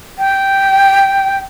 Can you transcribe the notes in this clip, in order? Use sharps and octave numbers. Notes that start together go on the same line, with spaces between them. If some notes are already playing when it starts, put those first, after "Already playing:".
G5